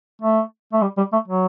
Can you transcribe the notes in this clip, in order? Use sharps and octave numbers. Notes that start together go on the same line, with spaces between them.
A3
A3
G3
G3
A3
F#3